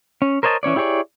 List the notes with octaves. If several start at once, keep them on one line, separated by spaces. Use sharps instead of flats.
C#4
A#4 C5 C#5 D#5 A5
E3 C#4 C#5 D5
E4 G4 G#4 C#5 D5